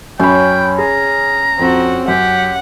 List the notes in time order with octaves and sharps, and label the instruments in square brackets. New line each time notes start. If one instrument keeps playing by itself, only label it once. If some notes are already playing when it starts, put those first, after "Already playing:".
[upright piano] F#2 B5 [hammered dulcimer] C#4 [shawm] G5
[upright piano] G#4 [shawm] A#5
[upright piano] F2 [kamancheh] C4 F#4
[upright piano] F#2 [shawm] G4 [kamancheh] F#5